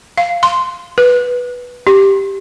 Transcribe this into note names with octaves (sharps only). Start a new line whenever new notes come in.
F5
C6
B4
G4